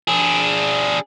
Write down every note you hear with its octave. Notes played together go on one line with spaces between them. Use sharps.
D4 G#4